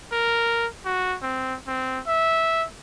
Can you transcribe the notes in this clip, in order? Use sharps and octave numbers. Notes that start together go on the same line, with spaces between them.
A#4
F#4
C4
C4
E5